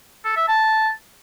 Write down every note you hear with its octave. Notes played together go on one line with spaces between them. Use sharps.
A4
E5
A5